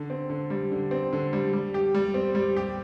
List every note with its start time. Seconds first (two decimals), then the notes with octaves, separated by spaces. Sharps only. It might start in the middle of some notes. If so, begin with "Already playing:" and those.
Already playing: D3
0.10 C4
0.30 D3
0.50 G3
0.72 D3
0.91 C4
1.13 D3
1.33 G3
1.53 G3
1.74 G4
1.94 G3
2.14 C4
2.35 G3
2.56 G4